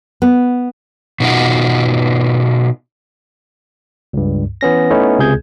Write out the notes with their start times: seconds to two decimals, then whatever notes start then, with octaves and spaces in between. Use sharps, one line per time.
0.22 B3
1.20 B2 D#4 F4 F#4
4.13 C#2 G2
4.61 E3 B3 C#4 A#6
4.91 A3 B3 C#4 D#4 E4
5.19 C#2 C3 G#4 G6 G#6